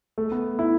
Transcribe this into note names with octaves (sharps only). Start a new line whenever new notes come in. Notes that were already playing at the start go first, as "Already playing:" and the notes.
A3
B3
E4